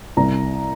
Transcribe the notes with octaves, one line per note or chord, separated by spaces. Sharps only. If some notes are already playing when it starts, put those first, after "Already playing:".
C2 A#5